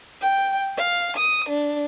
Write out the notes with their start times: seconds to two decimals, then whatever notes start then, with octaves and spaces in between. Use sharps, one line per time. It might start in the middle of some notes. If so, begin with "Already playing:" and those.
0.21 G5
0.77 F5
1.16 D#6
1.49 D4